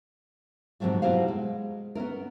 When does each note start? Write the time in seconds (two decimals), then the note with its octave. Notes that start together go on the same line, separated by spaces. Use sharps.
0.80 G#2 C3 D#3 F3 F#3 G#3
1.02 B2 F#3 E4 G4 C5 F5
1.28 G#3
1.95 B3 C#4 E4 A#4